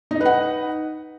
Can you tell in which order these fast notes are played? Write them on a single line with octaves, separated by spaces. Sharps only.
D#4 D#5 B4 F#5